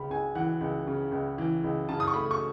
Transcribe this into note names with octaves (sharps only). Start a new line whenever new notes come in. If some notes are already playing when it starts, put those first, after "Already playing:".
Already playing: C#2 C#3 B5
C#2 G#5
E3 F#5
C#2
C#3
C#2
E3
C#2
C#3 A5
D#6
C#6
A3 B5
C#6